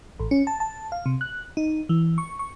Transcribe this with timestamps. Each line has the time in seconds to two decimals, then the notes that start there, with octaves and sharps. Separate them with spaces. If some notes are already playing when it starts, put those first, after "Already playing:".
0.19 A1
0.31 C#4
0.47 A5
0.60 A5
0.92 F5
1.06 C3
1.21 F#6
1.57 D#4
1.89 E3
2.18 C#6
2.39 C#6